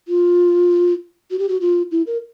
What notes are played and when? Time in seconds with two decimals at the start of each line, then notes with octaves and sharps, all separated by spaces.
0.08 F4
1.31 F#4
1.39 G4
1.49 F#4
1.61 F4
1.91 E4
2.07 A#4